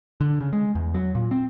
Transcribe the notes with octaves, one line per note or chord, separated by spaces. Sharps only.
D3
C#3
G#3
E2
F#3
A#2
C4